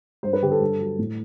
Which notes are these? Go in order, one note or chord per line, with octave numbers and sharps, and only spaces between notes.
G2 C5
B4
D3 G4
A4
G2
F#3
A2